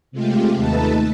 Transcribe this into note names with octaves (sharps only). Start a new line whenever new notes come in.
C3 G#3 A3 F4 G4
D#2 A3 D#4 A4 B4 A5